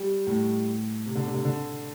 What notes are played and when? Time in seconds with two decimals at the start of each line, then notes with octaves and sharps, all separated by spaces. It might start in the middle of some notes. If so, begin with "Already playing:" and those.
Already playing: G3
0.27 A2
1.06 C3
1.15 D3
1.26 C3
1.34 D3
1.45 D3